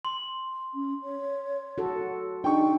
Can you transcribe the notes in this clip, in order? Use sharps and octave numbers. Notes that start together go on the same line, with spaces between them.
C6
C#4
C#5
F#4 A4
D4 D#4 G5 C#6